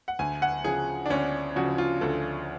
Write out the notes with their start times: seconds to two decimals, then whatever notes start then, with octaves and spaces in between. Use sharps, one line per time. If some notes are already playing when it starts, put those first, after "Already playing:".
0.08 F#5
0.19 D2 G#5
0.42 F#5
0.64 C#3 F3 G#4
1.06 D4
1.10 D2 C#4
1.56 C#3 F3 F#4
1.78 F4
2.01 D2 A4